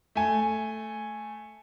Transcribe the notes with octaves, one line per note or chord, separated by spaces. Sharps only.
A3 G#5